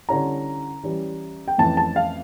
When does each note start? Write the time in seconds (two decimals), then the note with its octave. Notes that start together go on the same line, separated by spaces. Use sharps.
0.09 D3 G3 C#4 E4 A#5
0.83 E3 G3 C#4
1.48 G5
1.58 F2 E3 A3 C#4 A5
1.77 A5
1.96 F5